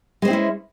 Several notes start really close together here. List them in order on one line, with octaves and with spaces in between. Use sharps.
G#3 C5 C4 E4 C#4